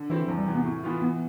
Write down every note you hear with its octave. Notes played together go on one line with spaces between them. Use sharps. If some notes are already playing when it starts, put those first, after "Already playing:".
Already playing: D3
E3 A3 C4 E4
E2 F3
G3
C3 E3
B3
A2
E3 B3 F4
E3 B3